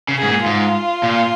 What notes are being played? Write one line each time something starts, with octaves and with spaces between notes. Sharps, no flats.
C#3
G#4
G#2
A#2
G#2 F4
A#2